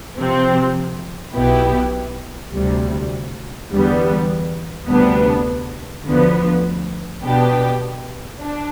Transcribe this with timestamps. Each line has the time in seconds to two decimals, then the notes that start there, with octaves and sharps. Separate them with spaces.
0.16 C3 F3 C4
1.34 B1 B2 B3 E4 G4
2.53 D2 C3 G3
3.70 E2 D3 G3 B3
4.88 D2 C3 G3 B3 D4
6.06 D2 D3 F3 B3
7.23 B2 B3 D4 G4
8.41 D4